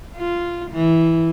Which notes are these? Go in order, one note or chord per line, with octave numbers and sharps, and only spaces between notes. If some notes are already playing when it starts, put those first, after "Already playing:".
F4
E3